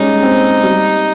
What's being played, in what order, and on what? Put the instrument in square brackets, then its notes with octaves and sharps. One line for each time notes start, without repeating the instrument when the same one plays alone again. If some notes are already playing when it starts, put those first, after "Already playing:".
Already playing: [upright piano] G3 G#3 C#4 [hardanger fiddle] D#4
[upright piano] C4
G3